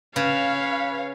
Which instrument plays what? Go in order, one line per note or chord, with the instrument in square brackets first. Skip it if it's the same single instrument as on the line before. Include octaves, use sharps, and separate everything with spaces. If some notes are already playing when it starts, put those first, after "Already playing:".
[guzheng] C#3 [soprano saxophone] B4 [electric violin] C#5 F5